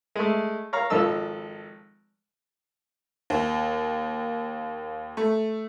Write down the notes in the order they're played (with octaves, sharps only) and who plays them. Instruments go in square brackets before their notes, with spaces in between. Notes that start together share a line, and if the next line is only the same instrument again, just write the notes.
[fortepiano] G#3 A3
C#5 F5 A#5
G#1 F3 D#4 A4 E6
[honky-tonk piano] D#2
A3